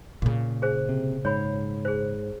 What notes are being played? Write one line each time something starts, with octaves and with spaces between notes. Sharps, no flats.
A#2 C#3
G#4 C5
C3
G#2 C#5 B5
G#4 C5